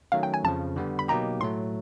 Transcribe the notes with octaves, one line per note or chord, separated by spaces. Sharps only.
D#3 F#3 A3 C#4 F5
G5
G#5
F2 C#3 F3 A5
D3 G3 B3
B5
B2 F#3 A#3 D#4 G4 A#5
A2 F#3 A3 C6